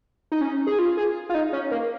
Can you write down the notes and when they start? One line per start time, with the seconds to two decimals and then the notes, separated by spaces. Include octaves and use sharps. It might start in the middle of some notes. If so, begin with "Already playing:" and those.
0.32 D#4
0.41 C#4
0.67 G#4
0.79 F4
0.97 G#4
1.29 F4
1.34 D#4
1.53 C#4
1.71 A#3